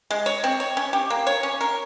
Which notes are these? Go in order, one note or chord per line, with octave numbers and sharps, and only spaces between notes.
G#3
C#5
C4
C#5
C#4
G4
A#3
C#5
C#4
A#4